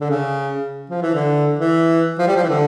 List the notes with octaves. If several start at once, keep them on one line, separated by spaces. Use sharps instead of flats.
D3
C#3
F3
E3
D3
E3
F3
G3
F3
E3
D3